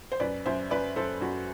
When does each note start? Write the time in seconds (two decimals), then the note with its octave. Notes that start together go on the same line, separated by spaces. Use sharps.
0.12 C5
0.20 F#2 B4 D5
0.46 F#2 C5 E5
0.70 F#2 B4 D5
0.96 F#2 A4 C5
1.21 F#2 F#4